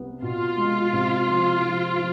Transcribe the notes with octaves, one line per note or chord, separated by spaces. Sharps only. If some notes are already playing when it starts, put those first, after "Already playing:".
Already playing: C2 B3
B2 F4
G#3
C3
F3
F3
F3